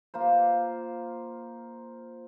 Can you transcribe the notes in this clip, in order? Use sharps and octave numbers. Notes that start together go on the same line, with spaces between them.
A#3 F4 C5